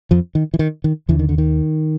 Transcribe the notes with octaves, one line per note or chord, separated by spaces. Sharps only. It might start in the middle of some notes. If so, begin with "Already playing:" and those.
F2 F3
D#3
E3
D#3
D#3
D#2 D3 E3
D#3
D3
D#3